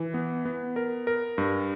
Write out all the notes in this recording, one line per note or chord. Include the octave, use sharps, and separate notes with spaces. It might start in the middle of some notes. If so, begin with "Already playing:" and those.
Already playing: E3
B3
B3
A#4
A#4
G2